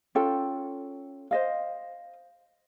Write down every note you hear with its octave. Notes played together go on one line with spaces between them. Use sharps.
C#4 F4 A4 G5
C5 D#5 F5